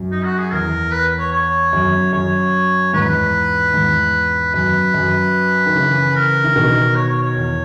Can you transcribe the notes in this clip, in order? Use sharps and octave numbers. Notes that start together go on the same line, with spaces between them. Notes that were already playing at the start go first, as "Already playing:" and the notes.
Already playing: F#2
D#4
F#4
G#4
E2 A#4
B4
C#5
C#5
F#2
F#2 C#5
E2 G#2 B4
E2 G#2
F#2 B4
F#2
D#3
C#3 E3
A#4
E3
B2 D#3
C#5
C#5
C#5
E2